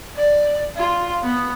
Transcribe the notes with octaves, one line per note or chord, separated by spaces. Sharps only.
D5
F4
B3